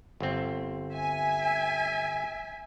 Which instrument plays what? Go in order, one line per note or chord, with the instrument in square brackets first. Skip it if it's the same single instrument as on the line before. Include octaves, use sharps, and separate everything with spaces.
[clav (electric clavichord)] G1 C4
[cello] E5 [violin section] G#5